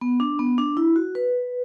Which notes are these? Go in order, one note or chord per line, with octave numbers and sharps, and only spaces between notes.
B3
D4
B3
D4
E4
F#4
B4